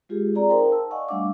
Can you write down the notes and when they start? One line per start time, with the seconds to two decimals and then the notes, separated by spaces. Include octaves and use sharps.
0.09 G#3 F4 G4 G#4
0.34 C4 F4 G#4 D5 A#5
0.49 D#4 A#4 C5 F5 G5 C6
0.69 A5 E6
0.91 D5 D#5 F5 F#5 G#5 C#6
1.08 G3 A3 D4 F5 D6 E6